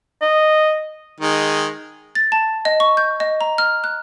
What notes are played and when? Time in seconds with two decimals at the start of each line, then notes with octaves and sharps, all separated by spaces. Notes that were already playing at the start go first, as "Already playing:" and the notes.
0.22 D#5
1.20 D#3 G#3
2.15 A6
2.32 A5
2.65 D#5
2.80 C#6
2.97 G6
3.20 D#5
3.41 A#5
3.58 F6
3.84 F#6